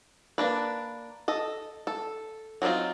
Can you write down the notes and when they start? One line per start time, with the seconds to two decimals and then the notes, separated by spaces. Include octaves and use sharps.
0.38 A#3 D4 B4
1.28 A4 D#5
1.87 A4
2.62 F#3 C4 D4 D#4 F4